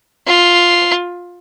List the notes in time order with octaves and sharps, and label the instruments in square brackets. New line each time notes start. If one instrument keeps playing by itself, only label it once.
[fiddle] F4